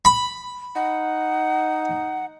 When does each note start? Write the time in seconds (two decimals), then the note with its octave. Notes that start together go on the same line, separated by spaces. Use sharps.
0.05 B5
0.76 D#4 F#5